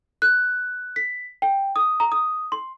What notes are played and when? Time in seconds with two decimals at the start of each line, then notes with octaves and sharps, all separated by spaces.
0.22 F#6
0.96 B6
1.42 G5
1.76 D#6
2.00 A#5
2.12 D#6
2.52 C6